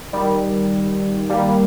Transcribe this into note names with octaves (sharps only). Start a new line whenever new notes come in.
D#3 G3
G3 A#3